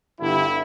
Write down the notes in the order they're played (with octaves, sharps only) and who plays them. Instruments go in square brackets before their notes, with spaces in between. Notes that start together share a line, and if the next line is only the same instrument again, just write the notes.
[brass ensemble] G1 G2 D3 E4